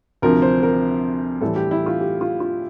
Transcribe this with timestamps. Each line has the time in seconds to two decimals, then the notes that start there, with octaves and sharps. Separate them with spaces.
0.22 D2 C3 F3 A#4
0.42 C5
0.63 A#4
1.41 A2 E3 G3 A4
1.56 G4
1.71 E4
1.86 F4
2.01 G4
2.21 F4
2.40 F4